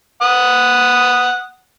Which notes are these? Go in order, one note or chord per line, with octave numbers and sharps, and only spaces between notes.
F#5 D#6